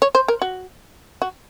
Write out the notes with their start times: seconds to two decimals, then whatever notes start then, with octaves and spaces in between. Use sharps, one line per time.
0.02 C#5
0.15 C5
0.28 A#4
0.42 F#4
1.22 F#4